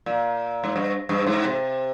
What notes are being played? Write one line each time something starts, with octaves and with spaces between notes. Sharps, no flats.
A#2
G#2
G2
G2
G#2
C3